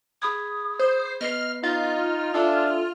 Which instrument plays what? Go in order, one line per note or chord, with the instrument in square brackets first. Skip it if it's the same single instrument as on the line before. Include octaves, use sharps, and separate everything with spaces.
[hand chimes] G#4 B5 G#6 [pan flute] D#6
[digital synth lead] C5
[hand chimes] B3 B4 C7 [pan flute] D#5 [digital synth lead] F6
[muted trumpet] D#4 [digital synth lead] F4 [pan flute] D#5
[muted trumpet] D4 [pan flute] A4 [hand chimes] E5 G#5 E6